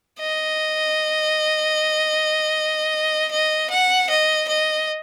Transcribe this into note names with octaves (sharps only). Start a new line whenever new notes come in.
D#5
D#5
F#5
D#5
D#5